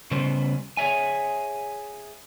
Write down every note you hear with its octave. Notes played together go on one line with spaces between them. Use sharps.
C#3 G3 B3 C#4 C5
G#4 C#5 E5 G#5